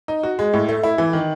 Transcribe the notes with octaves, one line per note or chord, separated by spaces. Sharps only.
D#4
F#4
G#3
A2
A3
E4
E3
D#3